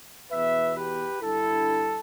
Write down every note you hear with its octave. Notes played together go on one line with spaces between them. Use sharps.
E2 B2 B4 E5
G4 B4
G2 D3 E4 A4